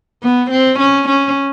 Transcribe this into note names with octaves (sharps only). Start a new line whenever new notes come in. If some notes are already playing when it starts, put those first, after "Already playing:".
B3
C4
C#4
C#4